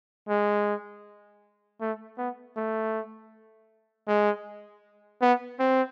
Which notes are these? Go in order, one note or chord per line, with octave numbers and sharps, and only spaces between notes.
G#3
A3
B3
A3
G#3
B3
C4